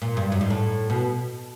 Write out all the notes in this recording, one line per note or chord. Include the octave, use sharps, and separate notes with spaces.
A#2
G2
F#2
G#2
A2
B2